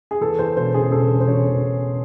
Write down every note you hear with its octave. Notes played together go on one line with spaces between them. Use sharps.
G#4
E2 A4
E2 C5
E1 C5
C#3 G#4
E1 A4
C#3
C5
E1 C#5
E1
E1